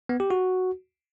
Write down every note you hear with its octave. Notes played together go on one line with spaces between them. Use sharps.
B3
G4
F#4